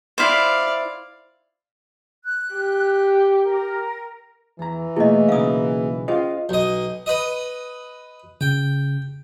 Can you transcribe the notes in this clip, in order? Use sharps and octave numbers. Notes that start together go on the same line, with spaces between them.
E4 C5 D5 F5
F#6
G4
A#4
E2 E3 A#5
B2 A3 A#3 E4 G#4 D#5
B1 C#3 A#4 F5 D#6
C#4 F4 G#4 C5 D#5 F5
B1 D#5
B4 D#5
C#3 G5